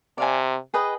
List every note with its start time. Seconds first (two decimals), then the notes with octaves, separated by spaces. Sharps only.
0.18 C3 D5 F5 G#5
0.74 G#4 B4 D#5 G5